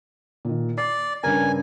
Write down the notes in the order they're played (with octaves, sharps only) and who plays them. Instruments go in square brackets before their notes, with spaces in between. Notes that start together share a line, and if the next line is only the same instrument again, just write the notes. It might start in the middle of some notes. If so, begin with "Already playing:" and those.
[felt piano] A#2 D#3
[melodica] D5 [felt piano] C7
[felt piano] G2 C#3 A#4 [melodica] G#5